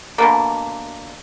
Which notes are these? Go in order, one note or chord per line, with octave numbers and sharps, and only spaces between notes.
B2 D3 A#3